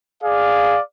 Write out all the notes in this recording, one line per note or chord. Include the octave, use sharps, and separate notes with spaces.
G#4 D5 F5